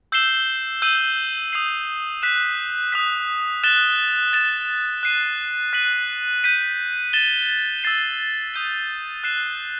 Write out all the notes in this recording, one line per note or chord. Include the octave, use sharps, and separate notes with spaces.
E6 G6 C7 E7 G7
E6 G6 D#7 F#7
D#6 G6 C7 F#7
F#6 B6 E7
D#6 F#6 B6
F#6 A6 E7 G7
A6 E7 G7
F#6 C7 D#7
F#6 B6 D#7 F#7
G6 B6 D#7
A6 E7 G7
E6 A6 C7
D#6 G6 D#7 G7
F#6 C7 E7 G7